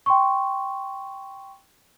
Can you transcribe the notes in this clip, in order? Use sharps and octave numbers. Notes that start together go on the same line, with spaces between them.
G5 C6 C#6